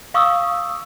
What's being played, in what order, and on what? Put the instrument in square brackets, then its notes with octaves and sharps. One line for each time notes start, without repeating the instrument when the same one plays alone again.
[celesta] F5 C#6 D#6 E6